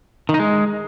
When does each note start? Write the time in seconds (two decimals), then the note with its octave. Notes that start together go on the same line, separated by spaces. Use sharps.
0.29 D#3
0.34 D#4
0.39 G#3